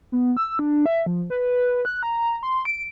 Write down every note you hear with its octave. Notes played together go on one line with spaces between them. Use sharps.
B3
E6
D4
E5
F3
B4
F#6
A#5
C6
D7